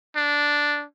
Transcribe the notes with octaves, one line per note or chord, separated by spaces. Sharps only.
D4